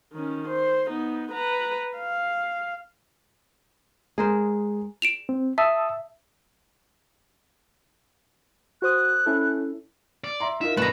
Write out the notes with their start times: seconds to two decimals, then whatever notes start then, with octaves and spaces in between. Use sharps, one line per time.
0.13 D#3 C#4
0.48 C5
0.88 B3 D#4
1.32 B4 A#5
1.98 F5
4.18 G#3 G#4 A#4 C5
5.02 D7 E7 F7
5.29 C4
5.58 E5 A5 D#6 E6
8.82 F#4 C5 D#6 F#6
9.26 C#4 E4 A4
10.24 D5
10.40 E5 A#5 C6
10.61 D#4 F4 A#4 E5
10.77 A#1 F#2 A3 D#4 B4 A#5